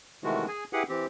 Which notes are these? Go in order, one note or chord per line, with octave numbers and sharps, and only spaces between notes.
C3 D#3 E3 G#3 A3 F#4
G#4 G#5
E4 G4 G#4 B4 F#5
E3 C4 G4